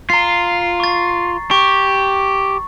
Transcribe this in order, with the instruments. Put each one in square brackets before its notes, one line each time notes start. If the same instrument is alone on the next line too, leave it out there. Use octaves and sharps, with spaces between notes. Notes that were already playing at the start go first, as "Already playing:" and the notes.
[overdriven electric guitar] F4 [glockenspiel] A#5 C7
[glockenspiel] C#6 A6
[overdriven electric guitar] G4 [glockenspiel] C#6